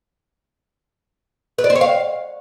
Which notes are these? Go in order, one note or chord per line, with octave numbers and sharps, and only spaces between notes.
B4
D5
C5
C#5
F5